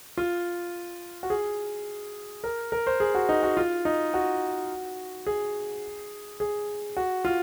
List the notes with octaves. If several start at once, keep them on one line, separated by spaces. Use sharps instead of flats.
F4
F#4
G#4
A#4
A#4
C5
G#4
F#4
D#4
F#4
F4
D#4
F#4
G#4
G#4
F#4
F4